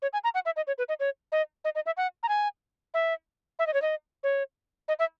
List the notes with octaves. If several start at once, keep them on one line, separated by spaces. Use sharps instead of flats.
C#5
G#5
A#5
F#5
E5
D#5
C#5
B4
D#5
C#5
D#5
D#5
D#5
E5
F#5
A#5
G#5
E5
E5
D#5
C#5
D#5
C#5
D#5
E5